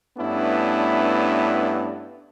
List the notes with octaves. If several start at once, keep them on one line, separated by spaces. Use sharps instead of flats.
G2 A3 B3 C#4 D4 E4